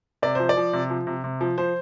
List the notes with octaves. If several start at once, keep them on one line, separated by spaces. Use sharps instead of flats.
C3 D5
F3 C5
D5
F3
C3
F3
C3
C3
F3
F3 C5